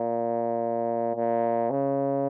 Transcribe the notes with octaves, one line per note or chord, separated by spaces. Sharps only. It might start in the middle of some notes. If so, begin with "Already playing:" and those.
Already playing: A#2
A#2
C#3